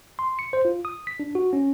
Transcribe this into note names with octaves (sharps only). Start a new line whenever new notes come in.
C6
C#7
C5
F4
D#6
B6
D4
F#4
C#4